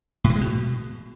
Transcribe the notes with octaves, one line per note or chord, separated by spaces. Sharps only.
A2
E3
G#3
B2